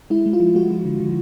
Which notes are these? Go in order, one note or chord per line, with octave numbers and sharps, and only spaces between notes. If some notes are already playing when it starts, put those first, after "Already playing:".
G#3 E4
G#3
F4
F3
G#3 F#4
F3
D3
D3